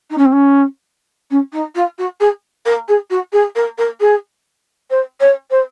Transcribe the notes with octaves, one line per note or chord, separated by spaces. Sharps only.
D#4
C#4
C4
C#4
C#4
D#4
F4
F#4
G#4
A#4
G#4
F#4
G#4
A#4
A#4
G#4
C5
C#5
C5